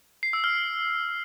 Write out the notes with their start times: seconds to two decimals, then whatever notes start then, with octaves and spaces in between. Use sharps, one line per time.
0.23 C7
0.33 E6
0.44 F6